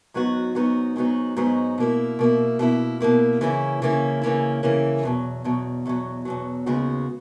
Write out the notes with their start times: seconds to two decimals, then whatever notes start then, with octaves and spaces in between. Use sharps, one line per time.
0.14 G#2 F#3 B3 D#4 F#4
0.55 G#2 F#3 B3 D#4 F#4
0.96 G#2 F#3 B3 D#4 F#4
1.37 G#2 F#3 B3 D#4 F#4
1.78 B2 A#3 E4
2.19 B2 A#3 E4
2.59 B2 A#3 E4
3.00 B2 A#3 E4
3.41 C#3 E3 A#3 C#4 E4
3.82 C#3 E3 A#3 C#4 E4
4.22 C#3 E3 A#3 C#4 E4
4.63 C#3 E3 A#3 C#4 E4
5.03 E2 B2 F#3
5.44 E2 B2 F#3
5.85 E2 B2 F#3
6.25 E2 B2 F#3
6.66 D#2 C#3 G#3 B3 F#4